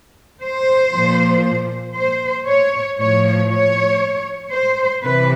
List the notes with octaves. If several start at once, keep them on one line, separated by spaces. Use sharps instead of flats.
C5
A#2 F3
C5
C#5
A2 F3 C#5
C#5
C5
C3 E3 B4